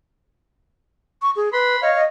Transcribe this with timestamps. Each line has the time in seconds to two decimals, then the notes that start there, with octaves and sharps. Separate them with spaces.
1.22 C#6
1.36 G#4
1.53 B4 B5 C6
1.82 C#5 D#5 F5
1.95 D#5